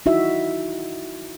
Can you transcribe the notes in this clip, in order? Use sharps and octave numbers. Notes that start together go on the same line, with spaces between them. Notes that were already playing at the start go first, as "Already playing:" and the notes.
D#4 E4 F#4 E5